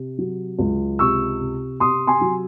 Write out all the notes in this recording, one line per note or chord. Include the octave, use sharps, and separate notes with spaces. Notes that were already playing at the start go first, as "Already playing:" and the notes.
Already playing: C3
F#3
C#2
C3 C#6 E6
C3
C3 C6 D#6
G#5 C6
F#3